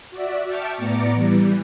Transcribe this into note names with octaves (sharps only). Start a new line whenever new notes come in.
F#4 D5 E5
E5 G5 A5 C#6 D6 F6
A2 B3 D5 A#5 D6 C#7
E3 G3